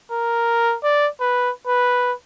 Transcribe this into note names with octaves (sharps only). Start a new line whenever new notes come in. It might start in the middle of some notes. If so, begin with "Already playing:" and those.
A#4
D5
B4
B4